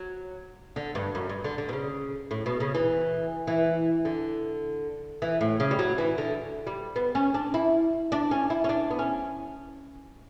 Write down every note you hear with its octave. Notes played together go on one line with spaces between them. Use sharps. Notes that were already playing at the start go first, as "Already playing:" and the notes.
Already playing: F#3
D3
G2
F#2
G2
D3
D3
B2
C#3
A2
B2
C#3
E3
E3
D3
E3
A2
C#3
G3
F#3
E3
D3
G3
B3
C#4
D4
E4
D4
C#4
E4
C#4
D4
B3
C#4